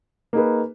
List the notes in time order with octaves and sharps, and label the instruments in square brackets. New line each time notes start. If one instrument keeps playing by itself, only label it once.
[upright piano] A#3 D#4 G#4 B4